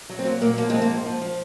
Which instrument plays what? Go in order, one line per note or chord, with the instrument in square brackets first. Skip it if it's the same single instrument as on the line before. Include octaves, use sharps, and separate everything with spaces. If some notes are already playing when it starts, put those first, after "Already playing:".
[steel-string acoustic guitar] F#3
C4
F#3 A#3
A#2 A#3
F3 A#3
F3 G#3 C4
A#3
G#2
F3
F3